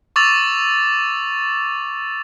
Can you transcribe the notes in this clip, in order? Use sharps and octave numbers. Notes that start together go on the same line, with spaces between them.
C#6 D6 E6 A6 F7